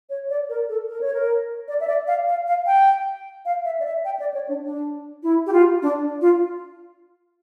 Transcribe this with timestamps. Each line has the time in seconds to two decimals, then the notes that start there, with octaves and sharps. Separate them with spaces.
0.10 C#5
0.30 D5
0.49 A#4
0.69 A4
0.88 A#4
1.01 C#5
1.14 A#4
1.68 D5
1.80 E5
1.87 D5
2.07 F5
2.27 F5
2.47 F5
2.66 G5
3.45 F5
3.65 E5
3.80 D5
3.85 E5
4.05 G5
4.20 D5
4.34 C#5
4.49 D4
4.64 D4
5.23 E4
5.46 G4
5.53 F4
5.82 D4
6.21 F4